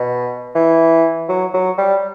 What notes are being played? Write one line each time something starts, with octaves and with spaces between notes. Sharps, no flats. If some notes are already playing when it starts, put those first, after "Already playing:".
Already playing: B2
E3
F#3
F#3
G3